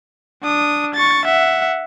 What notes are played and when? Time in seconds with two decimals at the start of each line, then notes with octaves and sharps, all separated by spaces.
0.43 D4 D#6
0.94 C#6 A6
1.25 E5 F#5